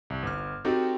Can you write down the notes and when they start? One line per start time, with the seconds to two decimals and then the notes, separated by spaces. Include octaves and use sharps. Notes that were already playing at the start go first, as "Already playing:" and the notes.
0.10 C2
0.23 G1 F6
0.65 C4 D#4 F#4 G4 A4